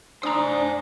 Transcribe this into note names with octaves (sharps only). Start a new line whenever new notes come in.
D4 C5 G#5 A#5 D#6